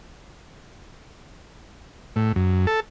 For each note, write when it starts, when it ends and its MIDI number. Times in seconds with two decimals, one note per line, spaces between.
2.16 2.32 45
2.36 2.66 42
2.67 2.80 69